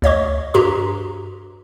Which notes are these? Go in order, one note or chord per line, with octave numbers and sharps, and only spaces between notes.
D2 C#5 D#5 C#6
G2 F#4 G4 A#5 C6